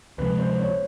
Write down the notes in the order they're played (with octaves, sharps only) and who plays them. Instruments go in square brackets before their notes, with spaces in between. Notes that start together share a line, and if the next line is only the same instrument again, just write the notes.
[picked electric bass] D2 C3 F3 G#3 [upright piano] B4
[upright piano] C5
C#5